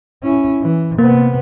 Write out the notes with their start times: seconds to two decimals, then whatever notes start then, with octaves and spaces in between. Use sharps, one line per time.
0.23 C#4 E4
0.61 E3
0.98 C3 A#3 B3